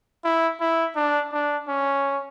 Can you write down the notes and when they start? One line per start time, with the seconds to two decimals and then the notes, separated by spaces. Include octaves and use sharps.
0.24 E4
0.61 E4
0.96 D4
1.32 D4
1.68 C#4